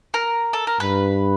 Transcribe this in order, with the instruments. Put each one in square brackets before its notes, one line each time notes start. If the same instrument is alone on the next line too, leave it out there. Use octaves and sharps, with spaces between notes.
[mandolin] A#4
A4
A#4
[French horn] G2 [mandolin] B4